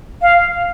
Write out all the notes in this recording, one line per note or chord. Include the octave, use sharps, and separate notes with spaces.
F5